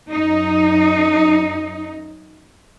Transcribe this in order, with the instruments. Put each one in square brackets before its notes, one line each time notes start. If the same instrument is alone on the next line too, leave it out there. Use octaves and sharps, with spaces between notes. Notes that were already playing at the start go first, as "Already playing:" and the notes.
[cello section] F#2 D#4